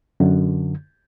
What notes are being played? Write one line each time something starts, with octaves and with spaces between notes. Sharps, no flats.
F#2 D3